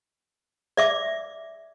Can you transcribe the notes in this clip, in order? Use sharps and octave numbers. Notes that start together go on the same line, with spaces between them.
D5 E5 D6